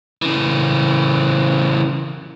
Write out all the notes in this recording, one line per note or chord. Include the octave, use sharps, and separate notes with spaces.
C#3 E3